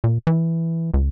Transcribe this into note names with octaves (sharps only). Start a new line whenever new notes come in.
A#2
E3
C#2